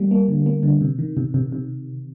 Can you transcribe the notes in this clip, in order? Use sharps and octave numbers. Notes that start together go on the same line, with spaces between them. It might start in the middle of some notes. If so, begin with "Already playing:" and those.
Already playing: G3 A#3
A#3
D3
A#3
D3
C3
D#3
C3
C3
C3